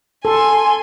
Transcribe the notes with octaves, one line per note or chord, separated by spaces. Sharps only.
A4 G#5 C6